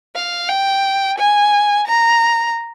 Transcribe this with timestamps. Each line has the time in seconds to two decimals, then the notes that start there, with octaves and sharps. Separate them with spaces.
0.15 F5
0.49 G5
1.18 G#5
1.88 A#5